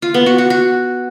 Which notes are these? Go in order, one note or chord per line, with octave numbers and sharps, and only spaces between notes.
F4
B3
F#4
F#4
F#4